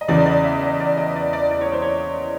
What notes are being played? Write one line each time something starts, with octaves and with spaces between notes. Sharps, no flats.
D#5
E2 C#3 E3 D5
D#5
D5
E5
D#5
D5
D#5
D5
D5
D5
C#5
C5
C#5